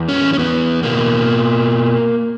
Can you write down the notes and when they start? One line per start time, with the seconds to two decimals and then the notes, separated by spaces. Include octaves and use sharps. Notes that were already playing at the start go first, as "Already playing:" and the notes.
Already playing: E2
0.09 C#4
0.33 C#4
0.38 E2 B3
0.83 B2 A#3